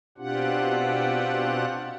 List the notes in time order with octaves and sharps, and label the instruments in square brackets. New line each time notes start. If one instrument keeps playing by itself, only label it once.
[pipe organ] B2 C4 D4 F4 G4 F#5